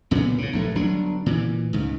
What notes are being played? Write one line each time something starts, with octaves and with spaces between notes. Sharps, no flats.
B1 A#2 C#3 B3
G#2 C#3
A#1 G2 A3
G1 F#3 D4
A#2 E3
C#2 G#2